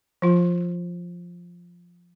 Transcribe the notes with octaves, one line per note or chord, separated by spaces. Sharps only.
F3 F4